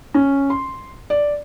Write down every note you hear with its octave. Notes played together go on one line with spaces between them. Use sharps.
C#4
C6
D5